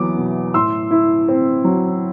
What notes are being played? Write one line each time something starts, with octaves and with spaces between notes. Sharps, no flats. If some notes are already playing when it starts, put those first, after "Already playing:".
Already playing: E2 F#3 B3 D6
B2
A2 C6 E6
E4
C4
F#3